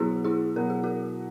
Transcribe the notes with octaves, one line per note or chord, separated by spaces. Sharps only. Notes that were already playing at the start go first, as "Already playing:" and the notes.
Already playing: B2 F#3 B3 E4 G#4
E4 G#4
B2 F#3 B3 A#4
G#4
F#4 A#4